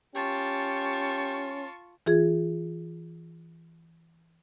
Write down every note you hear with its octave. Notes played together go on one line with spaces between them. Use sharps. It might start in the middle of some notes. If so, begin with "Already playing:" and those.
C#4 F4 G4 A5 C#6
E3 F4 G#4 G#6